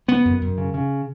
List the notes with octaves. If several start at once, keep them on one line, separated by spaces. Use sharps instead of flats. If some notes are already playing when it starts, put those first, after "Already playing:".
C#3 B3
F#2
F#2
C#3
C#3